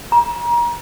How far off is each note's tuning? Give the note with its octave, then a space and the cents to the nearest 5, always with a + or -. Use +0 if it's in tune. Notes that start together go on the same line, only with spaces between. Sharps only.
A#5 +30